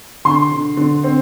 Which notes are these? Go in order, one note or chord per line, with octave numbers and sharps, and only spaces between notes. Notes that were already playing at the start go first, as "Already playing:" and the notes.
D3 C6
D3
D3
C4